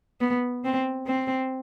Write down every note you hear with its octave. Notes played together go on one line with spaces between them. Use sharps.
B3
C4
C4